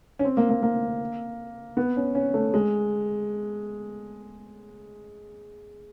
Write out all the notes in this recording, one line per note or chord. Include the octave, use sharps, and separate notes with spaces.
C#4
C4
A#3
A#3
A#3
B3
C#4
C#4
A3
G#3